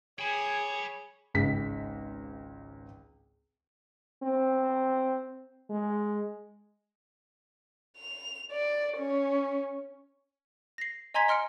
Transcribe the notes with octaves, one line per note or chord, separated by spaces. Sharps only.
G#4 C#5 G5 B5
G#1 C#2 B6
C4
G#3
F7
D5
C#4
A#6 C7
D#5 G#5 A#5 C6 G#6 B6
D#5 C6 F6 C#7 D7